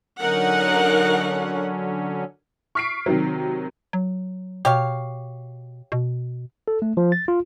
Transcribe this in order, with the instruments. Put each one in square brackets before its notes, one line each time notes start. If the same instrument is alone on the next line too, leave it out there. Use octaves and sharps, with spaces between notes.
[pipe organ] D3 F#3 C#4 [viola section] D#4 A#4 F#5
[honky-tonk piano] C#6 F6 B6 C7 D7
C3 D#3 F#3
[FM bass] F#3
[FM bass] B2 [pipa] G4 C#5 F5
[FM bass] B2
[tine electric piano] A4
A3
F3
A6
F4